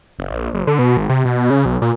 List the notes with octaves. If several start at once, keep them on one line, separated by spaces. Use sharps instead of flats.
F#1
A#1
F#1
D3
B2
G#1
C3
B2
C#3
B1
A#2